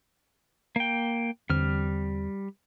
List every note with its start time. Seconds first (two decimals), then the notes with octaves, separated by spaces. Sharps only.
0.76 A#3 G5
1.50 E2 D3 G3 C4 F6